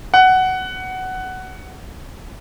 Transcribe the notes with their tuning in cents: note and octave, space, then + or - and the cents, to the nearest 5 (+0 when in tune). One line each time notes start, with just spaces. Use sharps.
F#5 +10